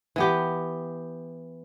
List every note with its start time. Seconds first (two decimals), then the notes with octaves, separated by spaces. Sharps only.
0.16 E3 B3 G4